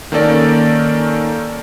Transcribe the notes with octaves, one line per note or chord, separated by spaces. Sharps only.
D#3 A#3 C#4 A4 D5